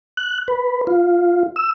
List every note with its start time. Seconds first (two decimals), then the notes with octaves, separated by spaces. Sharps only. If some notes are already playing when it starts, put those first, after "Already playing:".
0.17 F#6
0.48 B4
0.87 F4
1.56 E6